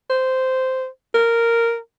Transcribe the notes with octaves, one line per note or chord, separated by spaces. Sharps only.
C5
A#4